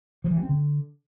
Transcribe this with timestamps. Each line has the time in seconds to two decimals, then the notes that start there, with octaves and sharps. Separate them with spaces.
0.24 F3
0.31 E3
0.37 G3
0.43 C4
0.49 D3